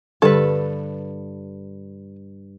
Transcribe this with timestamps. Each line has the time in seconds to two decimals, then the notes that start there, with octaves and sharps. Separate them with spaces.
0.22 G2 D3 A4 B4